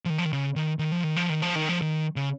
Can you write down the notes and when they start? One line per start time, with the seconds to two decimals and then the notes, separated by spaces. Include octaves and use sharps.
0.05 F3
0.10 D#3
0.18 F3
0.25 D#3
0.33 C#3
0.56 D#3
0.79 D#3
0.92 F3
1.04 D#3
1.16 F3
1.29 D#3
1.42 F3
1.56 D#3
1.69 F3
1.82 D#3
2.16 C#3